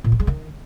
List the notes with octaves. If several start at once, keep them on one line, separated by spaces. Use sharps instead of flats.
A#2
A3
G#3
D#3